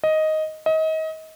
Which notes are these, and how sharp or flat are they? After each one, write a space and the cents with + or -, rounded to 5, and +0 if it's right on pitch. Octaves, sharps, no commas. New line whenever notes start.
D#5 +5
D#5 +30